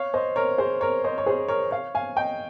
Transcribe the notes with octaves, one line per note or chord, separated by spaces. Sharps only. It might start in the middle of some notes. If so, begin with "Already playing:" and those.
Already playing: C#5 F5
C5 D#5
A#4 C#5
G#4 C5
A#4 C#5
C5 D#5
C#5
G#4 C5
A#4 C#5
C#5 F5
F5 G#5
D#5 G5